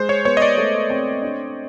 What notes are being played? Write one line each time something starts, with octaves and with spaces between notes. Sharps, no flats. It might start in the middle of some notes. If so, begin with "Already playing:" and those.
Already playing: G#3 C5
C#5
B3 C#5
D#5
D5
A3
C4
D4